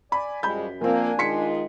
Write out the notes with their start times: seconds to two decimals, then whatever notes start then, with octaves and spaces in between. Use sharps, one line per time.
0.12 D5 G#5 B5
0.43 F#2 F3 G3 G#3 B5 G6
0.81 F3 A#3 C4 D4 G#5
1.19 D#3 G#3 F4 C6 B6 C#7